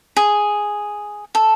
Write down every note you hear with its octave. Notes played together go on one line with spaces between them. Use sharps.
G#4
A4